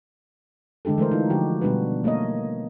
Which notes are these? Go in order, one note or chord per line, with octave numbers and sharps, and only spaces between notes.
D3 G#3 D4 G4 A4
E3 A3 A#4 C5
D#4 F4
D3 F3 F#4 G4
B2 G3 B3 D4 F#4 B4
A3 A#3 A#4 C#5 D#5